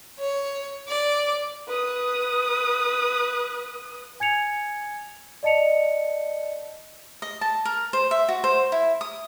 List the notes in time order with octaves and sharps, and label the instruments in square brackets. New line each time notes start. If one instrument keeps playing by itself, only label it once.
[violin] C#5
D5
[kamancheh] B4 D#6
[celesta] G#5 G#6 C#7 F7
D5 D#5 A5 C#7 F7
[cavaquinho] D#5
A5
A#4
C5
E5
F#4
C5
E4
D#6